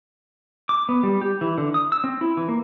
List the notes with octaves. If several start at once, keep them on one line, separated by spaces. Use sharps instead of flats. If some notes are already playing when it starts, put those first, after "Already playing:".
D6
B3
G3
G4
E3
D3
D#6
E6
C4
E4
E3
A#3